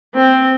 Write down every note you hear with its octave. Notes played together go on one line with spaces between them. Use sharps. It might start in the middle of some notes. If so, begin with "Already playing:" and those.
C4